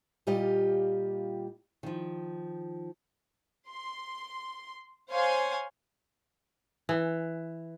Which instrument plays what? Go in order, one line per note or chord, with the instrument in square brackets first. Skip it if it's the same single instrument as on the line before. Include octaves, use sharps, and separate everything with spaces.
[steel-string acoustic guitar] A#2 G3 F4 G4 D#5
D#3 F3
[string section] C6
C5 C#5 F5 G#5 C6
[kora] E3